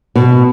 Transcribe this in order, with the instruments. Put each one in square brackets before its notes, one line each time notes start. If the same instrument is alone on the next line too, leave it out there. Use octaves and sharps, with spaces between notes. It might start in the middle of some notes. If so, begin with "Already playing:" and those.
[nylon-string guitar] B2